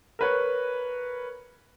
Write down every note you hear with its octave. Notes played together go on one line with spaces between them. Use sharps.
A#4 B4 C#5